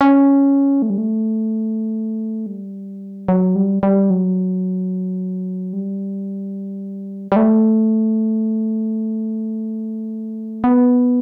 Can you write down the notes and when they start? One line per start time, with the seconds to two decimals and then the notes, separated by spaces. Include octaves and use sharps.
0.01 C#4
0.82 A3
0.90 G3
0.98 A3
2.46 G3
3.28 F#3
3.55 G3
3.83 G3
4.10 F#3
5.73 G3
7.32 G3
7.36 A3
10.64 B3